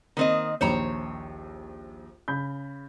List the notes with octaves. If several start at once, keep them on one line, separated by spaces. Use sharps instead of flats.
D#3 A#3 C4 D#5
A#1 D#2 C5 C#5 A#5
C#3 B5 G6